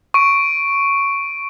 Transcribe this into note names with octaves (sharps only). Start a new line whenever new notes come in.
C#6 D7